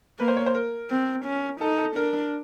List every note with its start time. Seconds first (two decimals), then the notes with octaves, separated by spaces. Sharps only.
0.19 A#3 B4
0.28 C5
0.37 C#5
0.46 C5
0.55 A#4
0.90 C4
1.25 C#4
1.61 D#4 A4
1.78 A4
1.96 D4 A#4